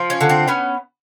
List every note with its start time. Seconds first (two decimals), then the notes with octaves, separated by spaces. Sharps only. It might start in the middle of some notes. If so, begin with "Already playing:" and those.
Already playing: F3
0.10 C#4
0.21 D3
0.29 C4
0.48 B3 C#4